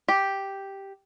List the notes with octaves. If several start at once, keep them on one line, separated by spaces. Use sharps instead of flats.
G4